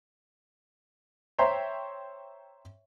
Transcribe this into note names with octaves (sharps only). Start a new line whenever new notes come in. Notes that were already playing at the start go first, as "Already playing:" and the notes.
C5 C#5 E5 G5 A#5 C6